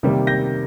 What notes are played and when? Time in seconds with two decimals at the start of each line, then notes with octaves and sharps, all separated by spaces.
0.03 C3 D#3 G3 A#3
0.27 G6 A#6